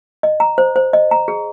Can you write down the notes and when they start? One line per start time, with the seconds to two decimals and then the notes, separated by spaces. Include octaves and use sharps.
0.23 D#5
0.40 A#5
0.58 C5
0.76 C5
0.93 D#5
1.11 A#5
1.28 G#4